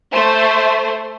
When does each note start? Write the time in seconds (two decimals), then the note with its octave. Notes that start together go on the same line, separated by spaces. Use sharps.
0.12 A3 C5